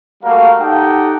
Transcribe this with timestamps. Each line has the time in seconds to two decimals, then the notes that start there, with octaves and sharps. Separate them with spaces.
0.23 G3 A3 A#3 F#4 A#4 F5
0.60 D#4 G4 A4 F#5 G5